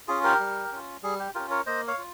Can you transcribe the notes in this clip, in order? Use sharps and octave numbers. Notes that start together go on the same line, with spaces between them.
C#4 F4 G#4
G4 A#4
G3
C#4 F4
G3 G#4
G4
C#4 F4 G4 A#4
A#4 C#5
A#3 C5 D#5
C#5 F5
F4